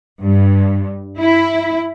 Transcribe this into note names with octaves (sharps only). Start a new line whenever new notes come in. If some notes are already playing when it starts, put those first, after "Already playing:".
G2
E4